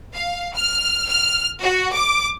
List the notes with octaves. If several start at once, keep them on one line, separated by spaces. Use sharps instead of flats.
F5
F6
F6
F#4
D6